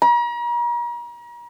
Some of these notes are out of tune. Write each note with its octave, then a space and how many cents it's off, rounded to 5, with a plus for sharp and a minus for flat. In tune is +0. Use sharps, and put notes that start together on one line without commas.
A#5 +40